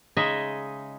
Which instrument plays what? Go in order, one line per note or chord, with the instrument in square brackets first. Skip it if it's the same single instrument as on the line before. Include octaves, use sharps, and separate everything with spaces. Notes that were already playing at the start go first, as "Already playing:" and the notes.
[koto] C#3 G#3 D#4 D#5 E5 G#5